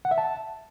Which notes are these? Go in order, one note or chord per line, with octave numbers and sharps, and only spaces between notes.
F#5
E5
A5